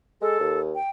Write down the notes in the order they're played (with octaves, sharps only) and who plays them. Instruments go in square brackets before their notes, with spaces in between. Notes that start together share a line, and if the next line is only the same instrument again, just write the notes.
[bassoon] G#3 [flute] A4
[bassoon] D#2
[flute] G5